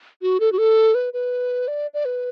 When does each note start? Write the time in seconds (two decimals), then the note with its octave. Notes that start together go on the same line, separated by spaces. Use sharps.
0.22 F#4
0.40 A4
0.52 F#4
0.58 A4
0.95 B4
1.13 B4
1.68 D5
1.94 D5
2.05 B4